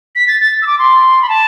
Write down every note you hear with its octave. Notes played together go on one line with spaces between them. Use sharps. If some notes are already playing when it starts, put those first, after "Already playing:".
B6
A6
A6
E6
D6
C6
B5
A5